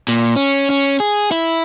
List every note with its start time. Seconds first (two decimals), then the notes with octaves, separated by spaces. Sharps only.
0.08 A#2
0.36 C#4
0.70 C#4
1.00 G#4
1.32 E4